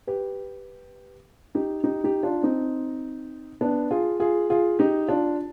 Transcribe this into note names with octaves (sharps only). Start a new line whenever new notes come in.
G4 B4
D#4 G4
D#4 G4
D#4 G4
D4 F4
C4 D#4
B3 D4
F4 G#4
F4 G#4
F4 G#4
D#4 G4
D4 F4